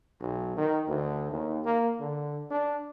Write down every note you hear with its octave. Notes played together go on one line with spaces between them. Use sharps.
B1
D#3
D2
D#2
A#3
D3
D4